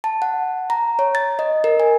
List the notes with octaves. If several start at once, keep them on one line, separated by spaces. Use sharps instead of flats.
A5
F#5
A#5
C#5
A6
D#5
A#4
G#5